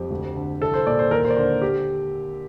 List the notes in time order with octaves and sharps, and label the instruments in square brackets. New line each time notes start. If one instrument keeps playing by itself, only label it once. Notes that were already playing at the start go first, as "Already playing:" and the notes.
Already playing: [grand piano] F2 G4
D2
D3
C2 A4
C5
A#2 D5
C5
D#2 A#4
C5
D5
D3 C5
G4